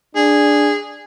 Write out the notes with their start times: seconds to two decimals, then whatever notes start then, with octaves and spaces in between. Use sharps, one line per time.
0.16 D4 G#4